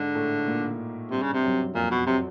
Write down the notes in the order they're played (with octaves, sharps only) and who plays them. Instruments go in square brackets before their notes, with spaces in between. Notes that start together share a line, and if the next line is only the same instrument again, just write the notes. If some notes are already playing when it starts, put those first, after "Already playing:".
Already playing: [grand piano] G#2 G#3 [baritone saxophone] D3
[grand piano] A2 A3
A#2 A#3
[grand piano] G2 G3 [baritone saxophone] C3
[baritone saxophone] C#3
C3
[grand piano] F#2 F#3
[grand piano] F2 F3 [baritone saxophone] A#2
[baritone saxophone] B2
[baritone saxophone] C3 [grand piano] F#3